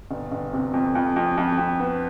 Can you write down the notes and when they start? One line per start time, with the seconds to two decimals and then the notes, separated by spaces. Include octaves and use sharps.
0.11 G1
0.32 G1
0.53 C3
0.74 F2
0.95 F2
1.16 F2
1.37 F2
1.58 F2
1.79 B3